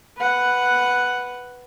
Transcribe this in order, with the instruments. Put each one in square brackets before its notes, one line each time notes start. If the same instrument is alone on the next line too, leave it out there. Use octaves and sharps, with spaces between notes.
[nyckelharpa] B4 F#5